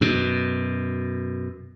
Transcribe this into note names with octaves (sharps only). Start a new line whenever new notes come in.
F#2 B2